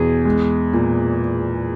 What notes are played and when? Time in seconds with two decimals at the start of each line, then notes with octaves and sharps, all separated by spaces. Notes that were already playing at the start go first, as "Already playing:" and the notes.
Already playing: E2 B2 G#4
0.25 G#3
0.73 A#2